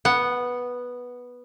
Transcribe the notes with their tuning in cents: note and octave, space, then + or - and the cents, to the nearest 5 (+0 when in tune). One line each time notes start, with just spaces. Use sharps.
B3 -5 F#5 +0